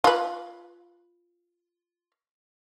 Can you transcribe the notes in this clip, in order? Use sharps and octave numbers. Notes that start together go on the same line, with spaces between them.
F4 B4